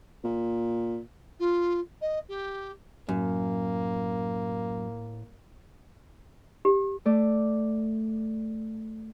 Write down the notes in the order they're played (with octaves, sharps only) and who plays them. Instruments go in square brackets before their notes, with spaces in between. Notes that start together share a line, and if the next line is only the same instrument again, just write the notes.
[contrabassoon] A#2
[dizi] F4
D#5
G4
[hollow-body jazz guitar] F#2 [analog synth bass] A2 [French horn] A#3
[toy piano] G4
[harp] A3 D5